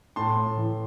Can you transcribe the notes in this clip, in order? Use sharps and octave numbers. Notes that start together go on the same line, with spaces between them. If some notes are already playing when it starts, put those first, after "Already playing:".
A2 A5 C6
A2
E3